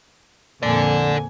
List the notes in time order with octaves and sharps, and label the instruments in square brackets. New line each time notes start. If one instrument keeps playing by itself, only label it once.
[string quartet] F2 A#2 G#5 [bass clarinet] D3 [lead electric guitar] A4 D5